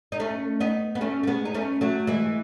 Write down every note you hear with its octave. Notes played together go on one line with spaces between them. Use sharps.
D#4
A3 C#4
B3 D#4
B3
A3 C#4
A3
G#3 B3
D#4
A3 C#4
F#3 A3
E3 G#3